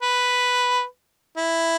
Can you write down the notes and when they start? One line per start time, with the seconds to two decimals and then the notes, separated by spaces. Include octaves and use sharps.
0.02 B4
1.37 E4